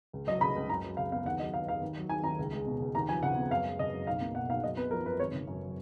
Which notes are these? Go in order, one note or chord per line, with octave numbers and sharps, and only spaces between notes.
C#2
F#3 D#5
C#3 B5
C#2
F#2 A#5
F#3
C#3 F5
B3 F5
D#2 F#5
F#3 D#5
D#3 F5
D#2 F5
D#2
F#3
D#3 G#5
D#2 A#5
C#2
G#3
B2
C#2
D#2 A#5
F3 G#5
C#3 F#5
B3
F#2 F5
G#3
C#3 D#5
F#2
B1 F5
A#3
B2 F#5
B1 F5
F#2 D#5
B3 B4
F3 A#4
F#2 B4
G#1 C#5
C#3
F#2
F#3